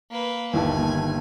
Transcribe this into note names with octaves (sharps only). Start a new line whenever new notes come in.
A#3 B4
G1 D#2 G#5 A5